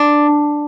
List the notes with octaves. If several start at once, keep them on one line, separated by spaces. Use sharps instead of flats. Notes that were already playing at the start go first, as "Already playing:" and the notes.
Already playing: D4